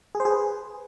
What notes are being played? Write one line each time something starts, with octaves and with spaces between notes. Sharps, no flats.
G#4
C5
G#4
B4